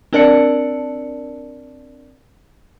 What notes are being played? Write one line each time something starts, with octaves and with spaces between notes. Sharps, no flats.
C4 D4 A#4 D5 A5 C#7